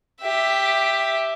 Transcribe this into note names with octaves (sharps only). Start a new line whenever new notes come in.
G4 E5